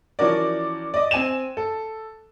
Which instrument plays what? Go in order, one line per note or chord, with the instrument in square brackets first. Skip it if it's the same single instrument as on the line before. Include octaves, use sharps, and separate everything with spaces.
[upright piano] E3 F3 C#4 F#4 A#4 D5
D5 D#5
C4 G#5 D#7 E7
A4